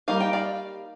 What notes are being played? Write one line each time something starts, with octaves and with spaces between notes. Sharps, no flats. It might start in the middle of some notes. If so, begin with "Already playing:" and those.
G3 A#3 D#4 F5
G5
D5 F5